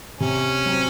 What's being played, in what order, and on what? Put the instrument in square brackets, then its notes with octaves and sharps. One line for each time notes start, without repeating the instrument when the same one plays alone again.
[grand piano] C3 [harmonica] C#4
[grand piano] F#3 C4